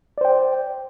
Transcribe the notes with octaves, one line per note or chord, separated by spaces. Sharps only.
C5 D5 G5